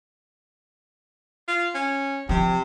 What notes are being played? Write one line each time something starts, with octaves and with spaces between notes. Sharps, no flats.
F4
C#4
C3 F3